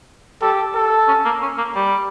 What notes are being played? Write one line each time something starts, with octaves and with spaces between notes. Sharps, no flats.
G4 A4
A4
C#4
A#3
C#4
A#3
G3